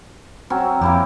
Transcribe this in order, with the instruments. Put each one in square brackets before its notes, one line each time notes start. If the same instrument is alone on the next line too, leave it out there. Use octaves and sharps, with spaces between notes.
[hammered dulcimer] F#3 C4 C#4
[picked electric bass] F2 [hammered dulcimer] A#3 E4 G4